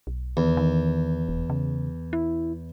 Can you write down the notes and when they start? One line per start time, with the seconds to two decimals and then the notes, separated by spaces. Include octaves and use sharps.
0.07 B1
0.37 E2 D#3
0.57 D#3
1.28 F1
1.50 C#3
2.13 E4